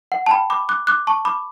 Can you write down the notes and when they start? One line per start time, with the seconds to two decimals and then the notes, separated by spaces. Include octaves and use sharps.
0.12 F#5
0.26 A5
0.30 G5 B5
0.50 B5 D6
0.69 D6 F#6
0.87 D6 F#6
1.07 A5 C#6
1.25 B5 D6